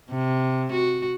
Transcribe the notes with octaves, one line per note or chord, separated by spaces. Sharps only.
C3
F#4